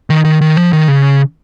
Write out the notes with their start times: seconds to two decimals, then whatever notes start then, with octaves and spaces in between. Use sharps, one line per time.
0.10 D#3
0.25 D#3
0.41 D#3
0.57 F3
0.73 D#3
0.88 C#3